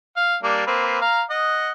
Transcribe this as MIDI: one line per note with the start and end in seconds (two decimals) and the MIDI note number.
0.17 0.36 77
0.43 0.66 55
0.43 0.66 58
0.43 0.66 62
0.67 1.00 58
0.67 1.00 60
0.67 1.00 71
1.01 1.22 77
1.01 1.22 82
1.30 1.72 75
1.30 1.72 78